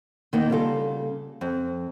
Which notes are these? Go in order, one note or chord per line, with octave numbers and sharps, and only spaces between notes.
D#3 A#3 B3 D#4
C#3 G3 F4 A4
F2